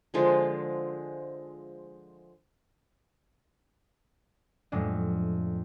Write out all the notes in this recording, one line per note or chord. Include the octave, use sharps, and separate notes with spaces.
D3 F3 G#3
F2 A2 F#3 G#3 A#3 D4